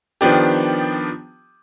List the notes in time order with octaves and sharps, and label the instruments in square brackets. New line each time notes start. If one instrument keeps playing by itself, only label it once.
[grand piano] D#3 F3 B3 D4 G4